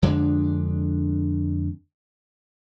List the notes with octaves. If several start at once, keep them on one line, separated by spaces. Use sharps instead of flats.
F2 D3 G#3 D4